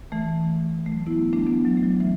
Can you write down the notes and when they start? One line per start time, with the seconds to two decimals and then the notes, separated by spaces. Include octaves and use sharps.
0.12 E3 A3
0.86 A3
0.92 F#3
1.07 B3 E4
1.33 A3 D4
1.47 F#3 B3
1.65 F#3
1.77 A3
1.83 F#3
2.00 E3 A3